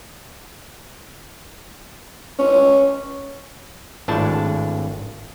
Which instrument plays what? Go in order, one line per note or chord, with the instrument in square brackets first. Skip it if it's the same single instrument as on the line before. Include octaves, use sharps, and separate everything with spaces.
[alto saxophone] C#4
[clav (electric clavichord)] G#1 A2 D4 A5